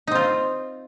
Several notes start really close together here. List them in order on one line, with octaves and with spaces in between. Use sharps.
D#4 C4 F4